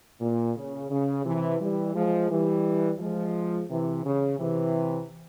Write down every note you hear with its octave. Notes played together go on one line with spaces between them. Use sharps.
A#2
C#3
C#3
C3 E3
E3 G3
F3 G#3
E3 G3
F3 G#3
C3 E3
C#3
C3 E3